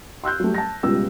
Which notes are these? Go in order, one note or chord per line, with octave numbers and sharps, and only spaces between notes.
C6 E6 F#6 G6
F#3 G3 A3
A5 A#6
C#2 B2 G3 G#3 F4 E6